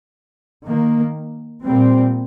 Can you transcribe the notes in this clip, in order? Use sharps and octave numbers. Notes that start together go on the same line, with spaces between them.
D#3 A#3
A#2 G3 C4